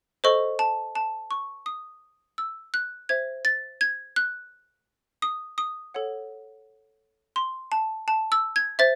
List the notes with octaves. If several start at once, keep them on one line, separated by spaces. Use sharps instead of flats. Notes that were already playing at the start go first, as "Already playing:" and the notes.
A4 C5 D#5 C#6
A5
A5
C#6
D#6
E6
F#6
C5 E5 G#6
A6
G#6
F#6
D#6
D#6
A4 C#5 F#5
C6
A5
A5
E6
G#6
C5 E5 A6